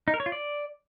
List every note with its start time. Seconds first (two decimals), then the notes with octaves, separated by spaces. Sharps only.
0.08 D#4
0.14 A#4
0.20 C#5
0.26 F4
0.32 D5